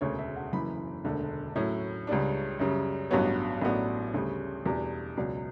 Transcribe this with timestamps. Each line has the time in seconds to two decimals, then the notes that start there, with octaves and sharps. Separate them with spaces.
0.01 E1 D2 C#3 C#5
0.18 E5
0.36 F#5
0.53 F#1 F#2 E3 B5
1.05 E1 D2 D3
1.56 A2 F#3 C#4 E4 C#5
2.07 C#2 C#3 G3 D4
2.59 F#2 C#3 G3
3.11 A1 G2 F#3 B3 C#5
3.61 A1 A2 F#3 B3 D4
4.14 D2 C#3 G3
4.66 E2 B2 G3 D4
5.17 C#2 B2 F#3 D5